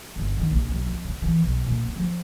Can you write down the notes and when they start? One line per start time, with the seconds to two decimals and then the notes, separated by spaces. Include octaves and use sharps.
0.16 G1
0.37 D#3
0.51 A#1
0.70 B1
0.86 F2
1.05 C#3
1.22 E3
1.42 B1
1.66 A#2
1.84 B3
1.96 F3